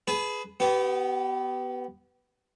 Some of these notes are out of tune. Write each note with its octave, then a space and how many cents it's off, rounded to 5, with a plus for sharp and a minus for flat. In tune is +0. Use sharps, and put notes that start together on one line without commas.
G#4 +10 B4 +10 A5 -45
B3 +5 G4 -35